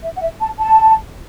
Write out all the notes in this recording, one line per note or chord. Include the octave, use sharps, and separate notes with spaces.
E5
F#5
E5
A5
A5